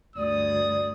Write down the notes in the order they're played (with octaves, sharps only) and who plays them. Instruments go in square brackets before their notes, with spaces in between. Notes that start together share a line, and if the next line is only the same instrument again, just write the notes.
[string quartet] D2 G2 [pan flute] D5 [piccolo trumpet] D#6